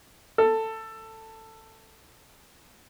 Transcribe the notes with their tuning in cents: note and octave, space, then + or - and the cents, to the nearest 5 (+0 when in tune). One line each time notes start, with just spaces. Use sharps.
A4 +15